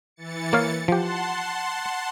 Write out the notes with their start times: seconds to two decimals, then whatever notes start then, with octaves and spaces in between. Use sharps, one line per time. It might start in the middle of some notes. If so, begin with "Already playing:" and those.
0.16 E3 A6 C#7
0.53 A#3 C#5 F5
0.88 F3 G4 F#5 A5 C6